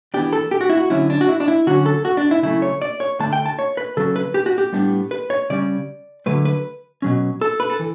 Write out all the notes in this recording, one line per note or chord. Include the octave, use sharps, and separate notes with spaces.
E3 B3 D4 G4
A4
G4
F#4
E4
F#4
D3 F#3 C#4 E4
D4
F#4
E4
D4
E4
D3 F#3 C#4 F#4
A4
F#4
D4
E4
C#3 F#3 A3 E4
C#5
D5
C#5
D3 A3 D4 A5
G5
A5
C#5
B4
C#3 F#3 C#4 A4
B4
G4
F#4
G4
A2 G3 B3 D4
B4
C#5
C#3 G3 C#4 D5
D3 F#3 A3 B4
B4
B2 F#3 C#4
A4
B4
A4
E3